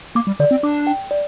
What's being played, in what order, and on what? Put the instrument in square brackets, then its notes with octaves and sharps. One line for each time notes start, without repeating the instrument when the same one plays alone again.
[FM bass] A#3 [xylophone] D6
[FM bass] G3
[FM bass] D3 [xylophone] D5
[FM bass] C4
[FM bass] D4 [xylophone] D6
[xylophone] G5
D5